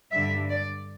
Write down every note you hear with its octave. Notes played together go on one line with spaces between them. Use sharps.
G2 D3 G3 E5
D5